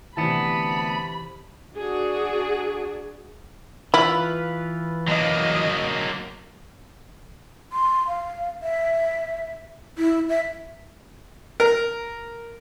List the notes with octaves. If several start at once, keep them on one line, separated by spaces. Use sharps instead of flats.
D2 C3 E3 B3 A5 B5
D4 F#4 G#4
E3 E4 F4 B4
F#3 A#3 D#5
C6
F5
E5
E4
E5
A#4